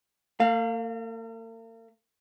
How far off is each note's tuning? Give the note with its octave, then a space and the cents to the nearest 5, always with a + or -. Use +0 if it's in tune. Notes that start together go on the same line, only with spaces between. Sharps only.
A#3 -45 F5 +0